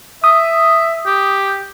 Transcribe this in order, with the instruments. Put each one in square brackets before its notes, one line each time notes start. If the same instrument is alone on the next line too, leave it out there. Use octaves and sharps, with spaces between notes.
[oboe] E5 [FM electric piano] D#6
[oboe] G4